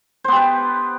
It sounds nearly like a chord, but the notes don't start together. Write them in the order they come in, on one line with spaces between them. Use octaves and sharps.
C5 B3 G4 B4